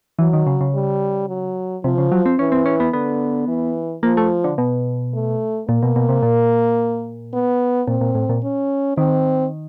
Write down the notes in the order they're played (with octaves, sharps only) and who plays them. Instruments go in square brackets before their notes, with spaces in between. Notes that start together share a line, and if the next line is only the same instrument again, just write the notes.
[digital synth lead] E3 [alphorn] F#3
[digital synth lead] D#3
C#3
C#3
[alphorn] G3
F#3
[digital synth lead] C3 [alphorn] F3
[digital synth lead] C#3
F#3
C4
[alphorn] E3 [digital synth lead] C#4
[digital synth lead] C4
C#4
B3
[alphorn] D3 [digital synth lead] B3
[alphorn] E3
[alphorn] F3 [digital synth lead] A#3
[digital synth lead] A3
D3
B2
[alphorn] A3
[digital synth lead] A#2 [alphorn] A#3
[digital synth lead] B2
B2
C3
A#2
[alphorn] B3
[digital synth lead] A#2 [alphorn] C4
[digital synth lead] A#2
A2
A#2
[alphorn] C#4
[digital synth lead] D#3 [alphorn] C4